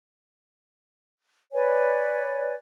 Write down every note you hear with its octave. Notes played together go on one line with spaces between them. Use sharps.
B4 C#5 D5 G#5